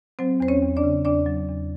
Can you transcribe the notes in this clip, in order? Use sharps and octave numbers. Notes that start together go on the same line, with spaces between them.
F#3 C4 C5
E2 C5
C#4 C#5
E2
D4 D5
C#3
E2 D4 D5
F#3
E2